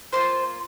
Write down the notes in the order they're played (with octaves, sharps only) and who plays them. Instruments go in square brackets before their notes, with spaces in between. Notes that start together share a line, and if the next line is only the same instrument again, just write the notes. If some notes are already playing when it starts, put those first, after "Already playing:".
[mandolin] A#3 F4 C5 C6